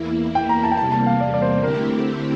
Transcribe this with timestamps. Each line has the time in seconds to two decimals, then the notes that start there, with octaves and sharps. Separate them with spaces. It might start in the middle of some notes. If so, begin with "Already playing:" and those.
Already playing: E2 E3 A#3 E4
0.35 G5
0.49 A#5
0.64 A5
0.72 G5
0.77 E2 C3 G3 A#3 A5
0.92 A5
1.06 F5
1.20 D5
1.34 D5
1.42 C5
1.63 D3 A3 C4 E4 G4 A#4